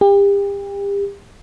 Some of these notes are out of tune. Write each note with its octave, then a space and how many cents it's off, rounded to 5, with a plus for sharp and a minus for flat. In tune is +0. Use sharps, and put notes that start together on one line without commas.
G4 +35